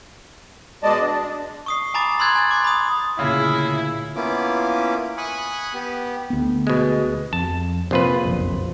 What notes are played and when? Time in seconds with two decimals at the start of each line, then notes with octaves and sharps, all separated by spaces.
0.83 B2 G#3 D5 D#5 A5
1.01 D4
1.66 C#6 D#6 C7
1.94 G#5 A#5 B5 D6 A6
2.19 B5 C6 E6 F#6 G#6 A6
2.35 G#5 A6
2.51 C6 D6
2.64 B5 D#6
3.19 D2 A#2 C#3 E4 G#4
4.16 A#3 B3 C#4 E4 F4 D6
5.18 G#5 B5 C#6 D#6 F#6
5.74 B3 G4
6.30 D2 B3
6.67 B2 G#3
7.33 F2 A5
7.91 A#1 C3 F4 B4
8.25 F#1 B1 F2